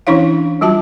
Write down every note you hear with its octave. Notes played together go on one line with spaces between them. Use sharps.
E3 C#4 D4 E4 C#5 F5
F#3 G3 F4 F#4 A5